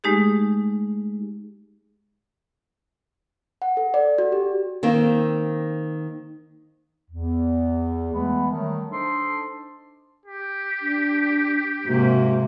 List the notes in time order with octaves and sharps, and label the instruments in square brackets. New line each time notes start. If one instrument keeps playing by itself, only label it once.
[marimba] G#3 A3 D#4 G4 G#4
[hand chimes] F#5
A4
D5
F#4
G4
[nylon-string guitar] D#3 A#3 C4
[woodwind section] E2
E3 G#3 A3 B3
D#3 F#3 G3 A3
D4 D#4 A4 C5 C6
[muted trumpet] G4
[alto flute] D4
[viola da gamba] G#2 C3 A#3 [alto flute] F#4